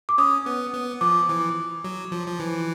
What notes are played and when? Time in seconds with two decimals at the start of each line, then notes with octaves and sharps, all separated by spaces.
0.09 D6
0.18 C#4 D#6
0.46 B3
0.73 B3
1.01 F3 D6
1.29 E3
1.84 F#3
2.12 F3
2.28 F3
2.39 E3